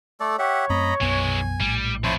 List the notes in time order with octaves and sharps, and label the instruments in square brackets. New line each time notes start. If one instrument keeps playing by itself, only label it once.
[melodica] A3 A4 D5
[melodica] G4 E5 F#5 [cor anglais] C#5
[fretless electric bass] F#2 A3 C4 [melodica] D#5 A#5 B5
[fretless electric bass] B1 F#2 B3 [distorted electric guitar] E3 G#3 [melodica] G#5
[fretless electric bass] A#1 A2 [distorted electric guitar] G3
[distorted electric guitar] F2 [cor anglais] E4 [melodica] C5 C#5 A5